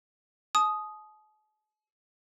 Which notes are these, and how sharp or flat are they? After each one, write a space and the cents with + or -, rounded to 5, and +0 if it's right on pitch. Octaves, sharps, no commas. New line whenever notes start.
A5 -45 D#6 +0